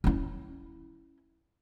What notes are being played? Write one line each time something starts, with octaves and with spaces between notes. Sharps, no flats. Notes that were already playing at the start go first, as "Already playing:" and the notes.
C#4 E4